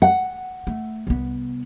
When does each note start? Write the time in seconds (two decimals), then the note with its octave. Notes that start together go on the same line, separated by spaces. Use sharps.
0.02 F#5
0.67 A3
1.07 C2 B3